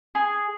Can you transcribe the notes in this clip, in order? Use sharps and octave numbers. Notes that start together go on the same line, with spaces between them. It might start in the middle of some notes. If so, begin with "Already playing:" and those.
G#4